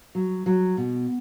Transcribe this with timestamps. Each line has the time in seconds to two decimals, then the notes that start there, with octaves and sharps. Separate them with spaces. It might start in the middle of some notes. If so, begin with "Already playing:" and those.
0.15 F#3
0.46 F#3
0.77 B2